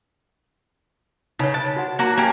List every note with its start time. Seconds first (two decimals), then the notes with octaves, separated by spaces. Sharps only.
1.39 C#3 D#4 C#5
1.54 C5 G#5 A5
1.76 F#4 F#5
1.99 A#3 F#4 A5 A#5
2.17 A#3 C#4 G4 A5